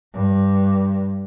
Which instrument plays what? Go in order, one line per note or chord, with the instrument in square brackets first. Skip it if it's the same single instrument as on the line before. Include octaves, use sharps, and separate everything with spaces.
[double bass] G2